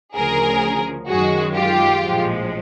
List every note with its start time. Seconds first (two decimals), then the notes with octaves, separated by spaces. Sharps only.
0.15 D2 C#3 F3 G#4 A#4
1.08 F#2 D#3 G#3 F#4 G#4
1.54 F4 G4
2.01 A#1 A2 F3 G#3